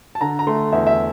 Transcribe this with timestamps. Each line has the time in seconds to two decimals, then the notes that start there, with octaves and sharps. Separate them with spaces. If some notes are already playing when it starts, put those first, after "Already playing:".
0.15 A5
0.21 D3 A#5
0.39 A#5
0.47 A3 C6
0.72 E2 E5
0.87 E5